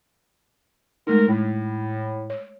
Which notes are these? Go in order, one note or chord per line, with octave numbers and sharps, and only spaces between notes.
G#3 A3 D#4 A#4
A2
C#5